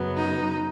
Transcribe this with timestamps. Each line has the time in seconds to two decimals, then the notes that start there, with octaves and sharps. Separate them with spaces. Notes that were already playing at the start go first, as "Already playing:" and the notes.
Already playing: F#2 C#3 F#3 B3
0.17 D#4